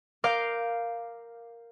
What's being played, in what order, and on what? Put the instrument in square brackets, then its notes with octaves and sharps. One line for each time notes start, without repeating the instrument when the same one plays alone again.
[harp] A#4 F5 D6 F6 G6